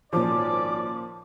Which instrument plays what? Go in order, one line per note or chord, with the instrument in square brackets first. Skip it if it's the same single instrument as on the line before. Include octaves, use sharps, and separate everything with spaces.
[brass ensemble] G#1 C#4 D5 [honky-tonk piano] A#2 F3 [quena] D6